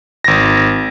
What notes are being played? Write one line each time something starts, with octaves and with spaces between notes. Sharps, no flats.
G#1 A#6